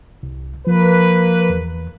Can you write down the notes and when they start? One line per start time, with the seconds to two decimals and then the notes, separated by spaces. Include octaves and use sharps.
0.23 C2
0.67 F3 A#3 B4
1.50 E2